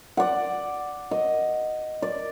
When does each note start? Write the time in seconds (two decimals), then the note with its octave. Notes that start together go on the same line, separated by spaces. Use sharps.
0.17 D5 F#5
1.11 D#5
2.02 D5